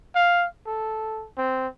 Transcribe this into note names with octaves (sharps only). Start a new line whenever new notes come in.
F5
A4
C4